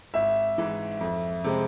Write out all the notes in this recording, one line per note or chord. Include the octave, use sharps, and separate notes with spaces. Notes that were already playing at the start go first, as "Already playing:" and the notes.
G#1 E5
G#2 E3
F2
C3 G#3 C4